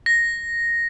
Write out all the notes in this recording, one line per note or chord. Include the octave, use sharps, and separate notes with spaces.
A#6